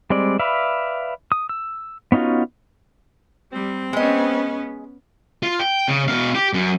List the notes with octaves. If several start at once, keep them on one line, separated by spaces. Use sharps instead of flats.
G3 G#3 C4 D5
B4 D5 E5 F5 B5
D#6
E6
B3 C#4 D#4 F4 F#4
G3 C4
G#3 B3 C#4 D#5
F4
G5
C#3
B2 F5
G4
F#2